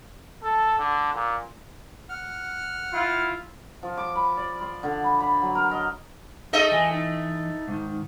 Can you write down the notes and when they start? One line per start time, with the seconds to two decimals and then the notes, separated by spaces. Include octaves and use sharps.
0.43 A4
0.78 D3
1.14 A#2
2.09 F#5 F6
2.91 E4 F4
3.83 F3
3.97 D6
4.15 B5
4.37 D5
4.61 C6
4.83 D3
5.04 B5
5.20 B5
5.42 F#3
5.55 A#4
5.71 D#5
6.53 A3 D#4 G#4 D#5
6.72 E3 G#5
6.92 D#4
7.68 G#2 D#3